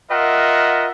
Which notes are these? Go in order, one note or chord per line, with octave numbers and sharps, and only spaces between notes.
F4 A#4 D#5 E5 F#5